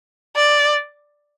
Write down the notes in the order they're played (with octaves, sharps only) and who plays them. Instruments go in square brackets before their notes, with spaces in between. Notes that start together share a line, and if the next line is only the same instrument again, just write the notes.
[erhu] D5